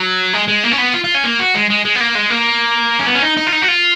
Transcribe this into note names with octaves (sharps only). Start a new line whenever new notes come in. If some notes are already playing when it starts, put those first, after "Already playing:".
Already playing: F#3
G#3
G#3
A#3
C#4
B3
F4
F4
C#4
A#3
F#4
G#3
G#3
G#3
B3
A#3
G#3
A#3
C#4
B3
C#4
D#4
D#4
F4
D#4
F#4
F4